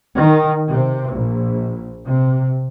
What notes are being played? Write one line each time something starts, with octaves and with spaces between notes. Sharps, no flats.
D#3
C3
A#1
C3